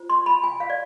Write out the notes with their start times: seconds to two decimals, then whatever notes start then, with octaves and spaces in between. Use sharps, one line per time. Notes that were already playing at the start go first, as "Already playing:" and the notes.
Already playing: F4 C5
0.10 C6
0.26 B5
0.43 G#5
0.60 F5
0.70 D5